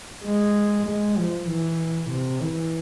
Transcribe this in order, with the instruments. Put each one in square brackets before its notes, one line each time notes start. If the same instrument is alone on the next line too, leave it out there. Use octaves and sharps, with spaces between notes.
[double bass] G#3
G#3
F3
E3
C3
E3